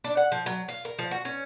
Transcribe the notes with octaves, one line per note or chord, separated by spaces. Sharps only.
D4
F#5
F3
F#3
F4
A#4
F3
F#4
C#4